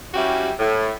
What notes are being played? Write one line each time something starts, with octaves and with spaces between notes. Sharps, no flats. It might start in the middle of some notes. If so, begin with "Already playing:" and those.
G3 C#4 E4 F#4 G4
A2